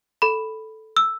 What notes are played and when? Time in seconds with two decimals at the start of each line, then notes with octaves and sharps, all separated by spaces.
0.22 A4 B5
0.97 E6